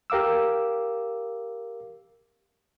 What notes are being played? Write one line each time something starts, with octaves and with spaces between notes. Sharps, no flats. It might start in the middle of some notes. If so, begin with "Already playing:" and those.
G4 A#4 F5 D6 E6